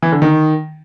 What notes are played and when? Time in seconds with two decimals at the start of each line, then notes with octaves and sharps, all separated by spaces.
0.02 E3
0.12 D3
0.22 D#3